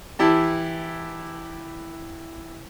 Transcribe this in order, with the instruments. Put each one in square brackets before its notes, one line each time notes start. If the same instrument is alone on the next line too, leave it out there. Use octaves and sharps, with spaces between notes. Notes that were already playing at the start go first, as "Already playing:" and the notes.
[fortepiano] E3 E4 G4 A5